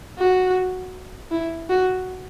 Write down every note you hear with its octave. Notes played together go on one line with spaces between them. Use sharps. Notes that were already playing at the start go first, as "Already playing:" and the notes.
F#4
E4
F#4